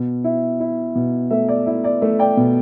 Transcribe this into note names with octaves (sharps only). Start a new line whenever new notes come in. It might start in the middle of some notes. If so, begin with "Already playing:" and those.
Already playing: B2
E4
E4
B2
A3 E5
D5
E4 E5
D5
A3 E5
D5 G5
B2